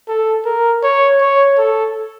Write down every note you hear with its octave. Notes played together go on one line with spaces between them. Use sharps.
A4
A#4
C#5
C#5
A4